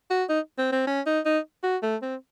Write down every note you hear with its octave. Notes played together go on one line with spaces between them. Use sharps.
F#4
D#4
C4
C4
C#4
D#4
D#4
F#4
A3
C4